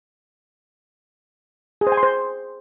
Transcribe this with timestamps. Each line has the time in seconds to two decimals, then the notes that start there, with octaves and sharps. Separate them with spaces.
1.81 G#4
1.87 C5
1.92 G#5
1.97 C6
2.03 C5